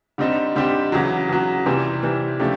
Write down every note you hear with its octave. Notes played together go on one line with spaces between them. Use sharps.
D3 G3 C4 D#4 G4
D3 G3 C4 D#4 G4
E2 C#3 F#3
E2 C#3 F#3
C3 E3 G3 C4
C3 E3 G3 C4
C#3 F3 A3 D4 G4